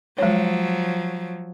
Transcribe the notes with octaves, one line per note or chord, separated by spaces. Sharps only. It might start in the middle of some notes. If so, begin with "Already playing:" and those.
F3 F#3 G#3 C#5